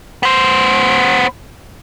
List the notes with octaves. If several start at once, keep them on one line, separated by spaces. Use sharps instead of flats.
B3 C5